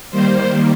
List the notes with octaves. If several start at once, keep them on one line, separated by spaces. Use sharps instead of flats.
D#3 G3 A#3 C5